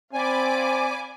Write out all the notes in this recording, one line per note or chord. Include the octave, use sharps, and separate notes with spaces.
C4 D5 F5 G#5 B5 D6